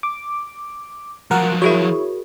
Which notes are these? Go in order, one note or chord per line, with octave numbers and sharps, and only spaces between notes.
D6
F3 F#3 A#4 F#5
E4 F#4 G#4 A#4 C#5